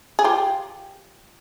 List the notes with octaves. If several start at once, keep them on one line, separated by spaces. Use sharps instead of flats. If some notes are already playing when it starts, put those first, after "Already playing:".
G#4
F4 G4